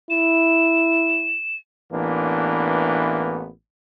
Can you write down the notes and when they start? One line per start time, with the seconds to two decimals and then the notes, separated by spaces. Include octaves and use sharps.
0.10 E4 E7
1.93 A1 E3 A#3 B3 D4